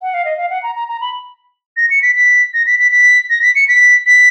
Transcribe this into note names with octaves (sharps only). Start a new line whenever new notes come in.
F#5
F5
D#5
F5
F#5
A#5
A#5
A#5
B5
A#6
C#7
B6
B6
A#6
B6
B6
B6
A#6
B6
C#7
B6
B6